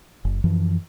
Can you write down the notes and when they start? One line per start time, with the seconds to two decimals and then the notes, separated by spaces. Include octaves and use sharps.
0.25 F#1
0.44 F#2 E3 F3